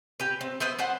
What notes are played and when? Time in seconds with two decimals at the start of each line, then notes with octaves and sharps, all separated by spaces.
0.20 G4 B4
0.41 C4
0.60 B3 B4 C5 E5
0.79 B4 C5 F#5